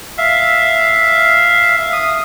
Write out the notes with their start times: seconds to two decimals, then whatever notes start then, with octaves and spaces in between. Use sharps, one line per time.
0.18 E5 F5
1.93 D#6